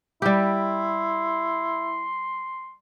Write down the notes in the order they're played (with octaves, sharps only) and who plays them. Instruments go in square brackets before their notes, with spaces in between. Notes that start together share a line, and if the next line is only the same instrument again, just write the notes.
[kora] G3 G4 [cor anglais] E4
[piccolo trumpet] C6